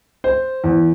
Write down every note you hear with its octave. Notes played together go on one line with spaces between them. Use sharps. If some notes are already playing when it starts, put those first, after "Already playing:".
C5
E2